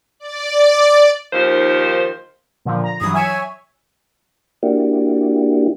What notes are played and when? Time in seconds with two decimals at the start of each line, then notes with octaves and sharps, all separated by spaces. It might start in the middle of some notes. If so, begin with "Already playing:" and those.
0.20 D5
1.33 D#2 D#3 F3 C5
2.65 A#2 D3 F3
2.84 A#5
3.01 G2 E3 F#3 D#6
3.14 C#5 E5 G#5
4.63 A#3 D4 E4 F#4 G4